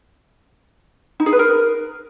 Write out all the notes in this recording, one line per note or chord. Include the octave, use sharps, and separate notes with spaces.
D#4
G#4
B4
A#4